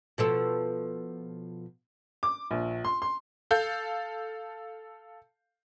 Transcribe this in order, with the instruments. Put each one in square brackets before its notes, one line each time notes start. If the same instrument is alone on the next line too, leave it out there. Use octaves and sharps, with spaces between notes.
[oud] B2 F3 A4
[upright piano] D6
A#1
C6
C6
[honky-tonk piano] A4 F5 G6